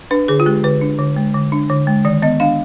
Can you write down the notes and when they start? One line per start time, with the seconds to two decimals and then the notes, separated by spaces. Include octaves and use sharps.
0.11 D4 B4
0.28 D3 G#4
0.40 F4
0.46 G#3 G4
0.64 D3 B4
0.81 D4
0.99 D3
1.17 G#3
1.34 D3
1.52 D4
1.70 D3
1.87 G#3
2.05 D#3 D5
2.22 B3 D#5
2.40 D4 F5